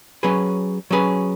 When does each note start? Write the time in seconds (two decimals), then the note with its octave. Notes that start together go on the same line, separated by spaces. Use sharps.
0.23 F#3 C#4 G#4 B4
0.91 F#3 C#4 G#4 B4